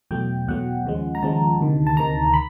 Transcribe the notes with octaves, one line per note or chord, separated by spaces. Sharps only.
E2 B2 F#3 A3 G5
E2 B2 F#3 A3 F#5
D#2 C#3 F3 G#3
A#5
D#2 C#3 F3 G#3 A5
D2 C3 D#3
A5
D2 C3 D#3 A#5
B5